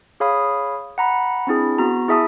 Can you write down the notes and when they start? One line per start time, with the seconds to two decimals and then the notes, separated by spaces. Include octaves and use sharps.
0.20 G#4 C#5 F5 B5 D#6
0.98 F#5 A#5 B5
1.47 C4 D4 E4 G#4
1.78 B3 F#4 A#5
2.08 E4 G#4 E5 A5 D#6